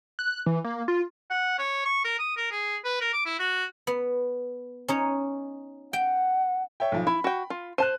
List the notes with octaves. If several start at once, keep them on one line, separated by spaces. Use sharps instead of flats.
F#6
E3
A#3
F4
F#5
C#5
C#6
A#4
D#6
A#4
G#4
B4
A#4
D6
E4
F#4
B3
C#4 D#4 C#5
F#5 G5
C#5 E5 G5
B1 F3
E4 B5
F#4 G5
F4
C5 A5 F#6 D#7